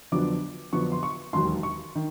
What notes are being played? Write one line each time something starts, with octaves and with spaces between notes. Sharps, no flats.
F2 D3 F#3 B3 D4 D6
F2 D3 F#3 B3 D4 C#6
C6
C#6
E1 D#2 D#3 F#3 C6
C#6
D#3